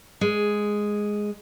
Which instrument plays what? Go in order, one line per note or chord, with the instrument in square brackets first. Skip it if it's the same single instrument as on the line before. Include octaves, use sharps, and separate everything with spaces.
[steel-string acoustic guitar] G#3